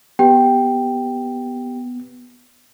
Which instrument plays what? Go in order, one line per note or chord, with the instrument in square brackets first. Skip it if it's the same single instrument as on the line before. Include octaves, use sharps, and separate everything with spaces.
[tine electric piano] B3 [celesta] G4 G5